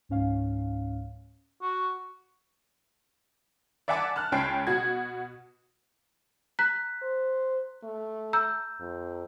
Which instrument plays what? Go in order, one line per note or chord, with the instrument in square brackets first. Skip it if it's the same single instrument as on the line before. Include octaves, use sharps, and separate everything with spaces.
[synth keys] C#2 G#2 C#4 F5
[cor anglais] F#4
[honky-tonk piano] D5 E5 F#5 G#5 A5 D6
A5 F6 F#6
C#2 C#4 G5 A5 C7
B2 F#4 G#6
[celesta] A#5 F#6 B6
[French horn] C5
A3
[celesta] A#5 E6 G6
[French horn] F2